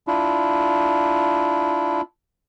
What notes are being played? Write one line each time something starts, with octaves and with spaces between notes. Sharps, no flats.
D4 E4 F4